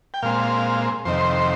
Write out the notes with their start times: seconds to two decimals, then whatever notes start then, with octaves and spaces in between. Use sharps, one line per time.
0.14 G5
0.22 A#2 G#3 C4 F5
1.05 F2 C3 D#3 C5